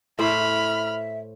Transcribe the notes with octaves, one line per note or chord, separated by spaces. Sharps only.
A2 C5 E5 B5 F6